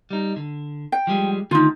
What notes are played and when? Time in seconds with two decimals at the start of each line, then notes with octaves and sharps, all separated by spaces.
0.11 G3 D#4
0.36 D3
0.92 G5
1.07 F3 G3 G#3
1.51 D3 D#3 A3 D#4 F4